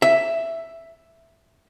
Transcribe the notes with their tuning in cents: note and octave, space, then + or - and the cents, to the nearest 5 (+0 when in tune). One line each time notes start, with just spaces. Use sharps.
E5 +5